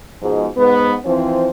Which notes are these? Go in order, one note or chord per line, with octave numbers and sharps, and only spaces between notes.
G#2 B2 F3 G#3
G#2 B3
E3 F3 C4